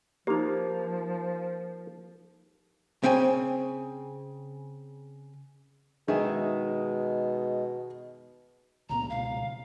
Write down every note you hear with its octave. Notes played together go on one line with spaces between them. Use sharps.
F3 A#3 D#4 G4
C#3 C4 G5 G#5
B2 D#3 G#3 D#4 G#4 E5
C#2 A#2 B3 A#5
C#2 B2 F5